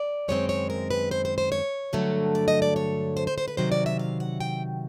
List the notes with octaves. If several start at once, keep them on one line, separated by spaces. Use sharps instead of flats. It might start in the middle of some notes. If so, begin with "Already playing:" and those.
Already playing: D5
F#2 D#3 G#3 C4 C#5
C#5
A#4
B4
C5
C5
C5
C#5
G2 D3 F#3 A3
D5
D#5
D5
C#5
C5
C5
C5
B4
C3 D#3 F#3 C5
D5
E5
F5
F#5
G5